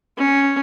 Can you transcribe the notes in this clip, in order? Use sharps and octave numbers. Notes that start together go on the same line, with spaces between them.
C#4